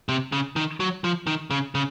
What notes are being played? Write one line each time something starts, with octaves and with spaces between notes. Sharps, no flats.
C3
C#3
D#3
F#3
F3
D#3
C#3
C#3